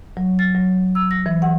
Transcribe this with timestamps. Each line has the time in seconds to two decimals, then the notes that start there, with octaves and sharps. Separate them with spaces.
0.17 F#3
0.39 A6
0.55 F#3
0.95 E6
1.11 A#6
1.26 E3
1.42 F#5